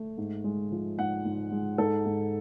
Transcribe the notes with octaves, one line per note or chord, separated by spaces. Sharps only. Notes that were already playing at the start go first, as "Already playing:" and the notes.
Already playing: A3
G#2
G#3
F3
G#2 F#5
G#2
G#3
G#2 A4
G#2